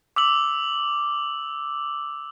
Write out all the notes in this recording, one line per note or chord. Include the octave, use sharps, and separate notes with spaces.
D6 E6 F#7